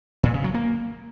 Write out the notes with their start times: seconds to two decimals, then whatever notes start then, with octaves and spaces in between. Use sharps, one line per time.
0.23 A#2
0.34 C#3
0.44 F#3
0.54 A#3